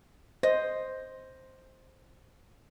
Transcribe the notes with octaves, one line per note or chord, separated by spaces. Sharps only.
C5 D#5